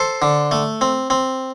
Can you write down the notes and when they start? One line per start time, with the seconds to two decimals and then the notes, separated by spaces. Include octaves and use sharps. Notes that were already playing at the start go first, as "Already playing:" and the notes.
Already playing: A4 C5
0.22 D3
0.51 A3
0.81 C4
1.10 C4